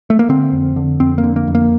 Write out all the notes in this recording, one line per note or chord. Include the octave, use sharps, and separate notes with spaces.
A3
A#3
D3 C4
F2
D3
F2 C4
A#3
D3
A#3
F2
A#3